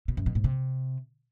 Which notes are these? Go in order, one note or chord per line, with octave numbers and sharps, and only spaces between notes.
B2
F#2
B2
G#2
C3